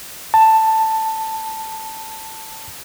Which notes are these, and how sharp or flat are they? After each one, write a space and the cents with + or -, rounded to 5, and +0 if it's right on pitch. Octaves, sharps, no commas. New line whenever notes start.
A5 +10